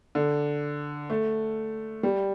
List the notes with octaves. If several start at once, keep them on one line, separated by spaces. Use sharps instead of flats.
D3
A3
G3